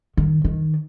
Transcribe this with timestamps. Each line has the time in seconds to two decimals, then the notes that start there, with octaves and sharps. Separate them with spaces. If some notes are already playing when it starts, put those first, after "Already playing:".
0.17 D#3
0.44 D#3